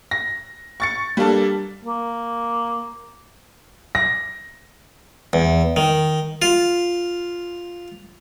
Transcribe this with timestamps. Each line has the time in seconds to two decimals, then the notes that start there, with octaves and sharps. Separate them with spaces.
0.11 A#6
0.80 C#6 A6 C#7
1.17 G3 A#3 D4 A4
1.84 A#3
3.95 A#6
5.33 E2
5.76 D#3
6.42 F4